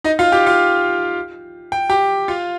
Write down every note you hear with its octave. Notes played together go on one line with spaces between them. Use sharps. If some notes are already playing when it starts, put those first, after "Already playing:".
D#4 D#5
F4 F5
G4 G5
F4 F5
G5
G4 G5
F4 F5